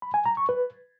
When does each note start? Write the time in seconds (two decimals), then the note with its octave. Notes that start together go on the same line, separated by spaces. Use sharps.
0.02 B5
0.14 G#5
0.26 A#5
0.37 C#6
0.49 B4